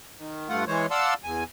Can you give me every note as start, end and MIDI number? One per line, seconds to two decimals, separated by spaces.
0.19 0.48 51
0.49 0.64 43
0.49 0.64 57
0.49 0.64 65
0.49 0.64 78
0.67 0.86 52
0.67 0.86 56
0.67 0.86 72
0.67 0.86 73
0.91 1.14 74
0.91 1.14 77
0.91 1.14 78
0.91 1.14 81
0.91 1.14 84
0.91 1.14 88
1.24 1.44 40
1.24 1.44 80